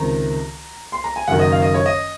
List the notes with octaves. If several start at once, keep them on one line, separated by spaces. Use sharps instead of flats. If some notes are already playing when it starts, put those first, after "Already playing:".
Already playing: C#2 C3 D#3 A#5
C6
A#5
G#5
F#1 F#2 D#3 F#5
D#5
F5
D#5
C#5
D#5